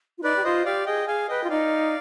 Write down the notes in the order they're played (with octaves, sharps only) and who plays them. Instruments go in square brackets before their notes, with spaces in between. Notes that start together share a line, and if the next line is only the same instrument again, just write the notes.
[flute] F4
[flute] D#4 [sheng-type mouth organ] B4 D5
[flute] G4
[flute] F4 [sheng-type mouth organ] C5 D#5
[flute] G4 [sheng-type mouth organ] D5 F5
[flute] G#4 [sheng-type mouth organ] D#5 G5
[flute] G#4 [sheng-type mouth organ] F5 G#5
[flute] B4 [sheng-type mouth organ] D#5 G5
[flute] F4
[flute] D#4 [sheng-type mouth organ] D5 F5